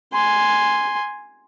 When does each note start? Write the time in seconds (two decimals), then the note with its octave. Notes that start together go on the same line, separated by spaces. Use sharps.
0.13 G#5 C6